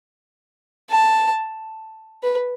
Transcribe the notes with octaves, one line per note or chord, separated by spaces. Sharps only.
A5
B4